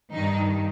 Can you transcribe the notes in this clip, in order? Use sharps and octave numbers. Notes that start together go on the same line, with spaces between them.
G2 D#3 D#4